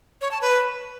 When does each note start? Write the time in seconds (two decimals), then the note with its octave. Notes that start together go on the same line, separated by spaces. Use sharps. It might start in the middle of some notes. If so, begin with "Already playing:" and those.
0.21 C#5
0.31 A5
0.41 B4